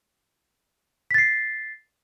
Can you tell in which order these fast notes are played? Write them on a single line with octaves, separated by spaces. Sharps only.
B6 A6 C7